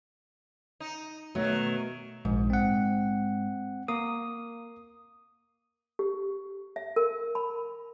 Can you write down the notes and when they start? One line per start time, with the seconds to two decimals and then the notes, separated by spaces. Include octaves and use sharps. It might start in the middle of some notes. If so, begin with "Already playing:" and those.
0.80 D#4
1.35 B2 D#3 F#3 A3
2.25 A#1 G#2
2.50 C4 F#5
3.88 A#3 D#6
5.99 G4
6.76 E5
6.96 A#4
7.35 B5